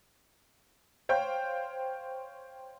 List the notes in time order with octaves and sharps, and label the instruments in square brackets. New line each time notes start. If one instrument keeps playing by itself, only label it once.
[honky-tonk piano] C5 C#5 F5 G5 G6